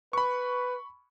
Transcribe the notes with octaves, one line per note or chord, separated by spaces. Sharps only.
B4 B5 C#6